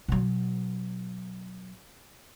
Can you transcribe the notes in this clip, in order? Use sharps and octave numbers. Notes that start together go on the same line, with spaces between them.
B2 F#3